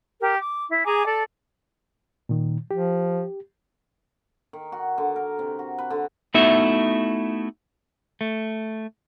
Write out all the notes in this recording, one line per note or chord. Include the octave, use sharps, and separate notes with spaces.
G4 A#4
D6
E4
G#4 G#5 A#5 D6
A4 D5 A5
A#2 D#3
F3 G4
D#3
F#4
D3
A#4
C3
F#4
B4
D3
A3 B3 D#4 E4 F#4 E5
A3